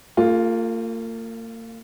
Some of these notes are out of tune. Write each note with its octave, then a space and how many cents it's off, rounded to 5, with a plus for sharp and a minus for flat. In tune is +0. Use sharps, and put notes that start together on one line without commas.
A#3 -40 F4 +0 G#4 +0